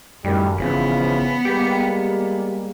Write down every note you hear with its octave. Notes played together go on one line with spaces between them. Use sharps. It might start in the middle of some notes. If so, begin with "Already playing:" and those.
F#2 A2 D#3 G3
G#1 C#3 E3 F3 B3
G3 G#3 A#3 G4